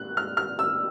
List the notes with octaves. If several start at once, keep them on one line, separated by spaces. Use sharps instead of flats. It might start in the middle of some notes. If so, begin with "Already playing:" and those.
Already playing: F#6
F6
F6
E6